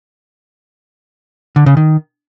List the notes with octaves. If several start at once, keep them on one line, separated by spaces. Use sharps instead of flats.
D3
C#3
D#3